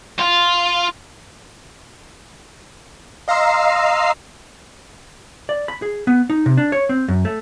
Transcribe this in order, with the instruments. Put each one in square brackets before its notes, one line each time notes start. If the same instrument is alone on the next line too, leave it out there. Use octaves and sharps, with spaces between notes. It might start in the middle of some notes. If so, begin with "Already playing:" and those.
[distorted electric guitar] F4
[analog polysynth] D#5 F5 A#5 C6 E6 C7
[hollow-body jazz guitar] D5
B5
G#4
B3
D#4
C3
D4
C#5
C4
F#2
A3